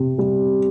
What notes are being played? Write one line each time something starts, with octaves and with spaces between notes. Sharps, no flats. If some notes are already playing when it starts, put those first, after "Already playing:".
Already playing: C3
G3